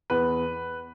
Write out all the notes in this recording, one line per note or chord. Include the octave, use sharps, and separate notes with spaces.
E2 B4